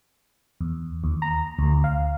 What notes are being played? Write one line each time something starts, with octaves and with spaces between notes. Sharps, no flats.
E2
D#2
A#5
D2
F5